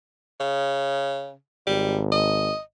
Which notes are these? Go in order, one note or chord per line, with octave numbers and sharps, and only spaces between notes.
C#3
G#1 G3
D#5